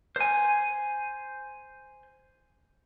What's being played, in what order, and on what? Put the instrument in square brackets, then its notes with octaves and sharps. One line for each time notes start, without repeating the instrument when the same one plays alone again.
[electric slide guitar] C5 G#5